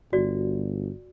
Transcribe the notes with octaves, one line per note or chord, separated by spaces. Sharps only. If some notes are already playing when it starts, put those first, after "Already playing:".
G1 F#4 D5